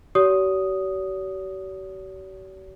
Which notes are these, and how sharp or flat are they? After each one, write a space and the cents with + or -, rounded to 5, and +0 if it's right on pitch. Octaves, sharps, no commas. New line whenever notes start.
G4 -45 C#5 +45 D#6 +0